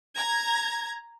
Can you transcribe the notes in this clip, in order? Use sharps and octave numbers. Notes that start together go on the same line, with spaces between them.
A#5 G#6